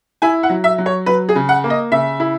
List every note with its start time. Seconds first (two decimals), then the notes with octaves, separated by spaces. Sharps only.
0.22 E4 G#5
0.43 F#5
0.49 F#3
0.64 E5
0.78 F#3
0.86 C#5
1.06 F#3 B4
1.29 G#4
1.35 C#3
1.49 F#5
1.64 A#3
1.70 D#5
1.92 C#3 E5
2.20 E4